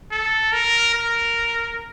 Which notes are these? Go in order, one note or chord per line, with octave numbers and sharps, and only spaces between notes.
A4
A#4
A#4